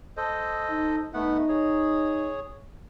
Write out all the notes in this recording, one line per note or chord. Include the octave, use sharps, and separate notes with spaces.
A4 C5 D#5
D#4
A3 B3 D#4 F#5
G#4 C#5